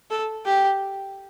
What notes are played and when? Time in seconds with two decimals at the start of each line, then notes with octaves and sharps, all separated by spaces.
0.10 A4
0.45 G4